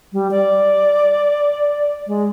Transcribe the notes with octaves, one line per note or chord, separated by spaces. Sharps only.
G3
D5
G#3